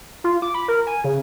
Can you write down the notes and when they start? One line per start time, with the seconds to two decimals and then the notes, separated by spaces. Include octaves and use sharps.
0.24 F4
0.42 D6
0.54 B5
0.68 A#4
0.87 G#5
1.04 C#3